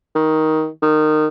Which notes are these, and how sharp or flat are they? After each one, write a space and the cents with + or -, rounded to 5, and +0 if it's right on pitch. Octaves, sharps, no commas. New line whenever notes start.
D#3 +15
D#3 -20